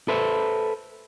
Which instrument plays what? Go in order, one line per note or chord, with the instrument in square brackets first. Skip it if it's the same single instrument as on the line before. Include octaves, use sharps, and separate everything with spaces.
[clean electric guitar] A4 B4 C5 E5